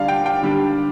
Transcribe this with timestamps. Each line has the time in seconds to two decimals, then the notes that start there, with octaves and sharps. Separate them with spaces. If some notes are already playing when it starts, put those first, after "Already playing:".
Already playing: D3 G3 D4 D5 F5
0.08 G5
0.26 G5
0.43 D3 G3 D4